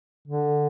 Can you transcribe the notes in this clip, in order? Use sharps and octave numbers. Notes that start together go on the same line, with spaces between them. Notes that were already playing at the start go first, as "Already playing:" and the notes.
D3